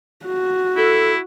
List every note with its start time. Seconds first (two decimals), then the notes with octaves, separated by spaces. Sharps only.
0.26 F#4
0.77 E4 A4